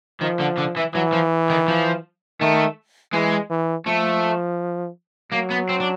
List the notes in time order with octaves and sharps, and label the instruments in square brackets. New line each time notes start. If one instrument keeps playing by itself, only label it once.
[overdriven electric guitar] D#3 [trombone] F3
[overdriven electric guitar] D3
D3
E3
[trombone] E3 [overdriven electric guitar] F#3
[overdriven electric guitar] F3
D#3
F3
[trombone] D#3 [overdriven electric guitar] A3
[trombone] E3 [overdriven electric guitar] G#3
[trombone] E3
[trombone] F3 [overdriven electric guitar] A3
[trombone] F#3 [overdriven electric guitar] A#3
[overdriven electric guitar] B3
C4
D4